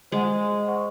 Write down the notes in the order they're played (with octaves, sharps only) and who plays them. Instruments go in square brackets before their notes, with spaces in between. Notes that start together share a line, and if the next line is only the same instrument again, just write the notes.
[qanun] G#3 [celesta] C5 D#5 F#5
[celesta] C5 F#5 C#6